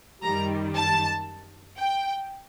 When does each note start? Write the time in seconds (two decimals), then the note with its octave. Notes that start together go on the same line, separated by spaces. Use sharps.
0.23 F#2 D#3 G3 A#5
0.75 A5
1.78 G5